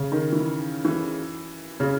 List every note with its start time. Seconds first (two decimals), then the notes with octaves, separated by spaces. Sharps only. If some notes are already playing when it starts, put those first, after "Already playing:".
Already playing: C#3
0.12 D#3
0.32 E3
0.85 E3
1.80 C#3